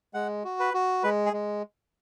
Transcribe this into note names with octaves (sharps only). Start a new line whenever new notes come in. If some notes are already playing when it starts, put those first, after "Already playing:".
G#3 F#5
F#4
B4
F#4
G#3 B4
G#4
G#3